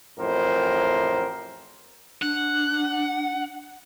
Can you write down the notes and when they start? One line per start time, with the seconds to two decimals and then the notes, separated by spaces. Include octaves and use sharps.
0.19 A1 F2 A2 A#4 C5
2.22 D4 F#5